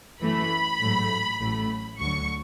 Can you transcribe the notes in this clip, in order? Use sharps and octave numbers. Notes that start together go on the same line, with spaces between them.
F#2 E3 A3 B5
A1 G#2 F#3 A3
A1 A2 F#3 A3
D2 D3 F#3 C#6